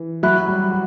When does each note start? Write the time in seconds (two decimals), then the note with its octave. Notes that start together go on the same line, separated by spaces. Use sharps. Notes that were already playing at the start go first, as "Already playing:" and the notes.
Already playing: E3
0.23 F#3 E5 B5 F#6
0.48 G3
0.71 F#4